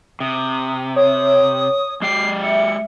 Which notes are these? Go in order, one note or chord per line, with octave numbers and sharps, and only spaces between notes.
C3 D#6
C#5 D#6
G#3 G4 G5 C7
E5 C#7